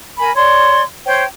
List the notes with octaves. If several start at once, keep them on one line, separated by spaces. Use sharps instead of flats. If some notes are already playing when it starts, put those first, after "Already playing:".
A#4 G#5 B5
C#5 D5 C6
C5 C#5 G5